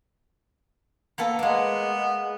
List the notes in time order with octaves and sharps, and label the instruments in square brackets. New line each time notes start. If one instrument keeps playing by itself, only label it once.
[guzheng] A#3 B3 A4
[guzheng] G#3 A#3 [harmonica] B3